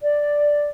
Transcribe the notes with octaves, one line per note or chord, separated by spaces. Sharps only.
D5